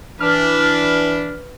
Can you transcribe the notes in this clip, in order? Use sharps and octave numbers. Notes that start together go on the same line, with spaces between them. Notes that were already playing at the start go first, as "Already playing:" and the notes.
E3 D4 B4 F6